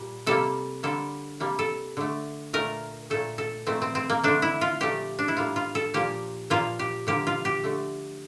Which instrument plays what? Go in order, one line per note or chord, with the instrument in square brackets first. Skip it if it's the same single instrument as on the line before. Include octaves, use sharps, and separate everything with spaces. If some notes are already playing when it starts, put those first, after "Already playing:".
Already playing: [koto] A#2 G3
C3 G3 A#3 A4
D3 G3 A#3 A4
C3 G3 A#3
A4
D3 A3
A#2 A3 A#4
A#2 A3 A4
A4
A#2 F3 A3 C4
C4
C4
A#3
D3 A3 D4
E4
F4
A#2 F3 A3 G4
D4
E4
A2 G3 A#3 F4
F4
A4
A#2 F3 A#3 G4
A#2 F3 A#3 F4
G4
D3 F3 A#3 G4
F4
G4
D3 A3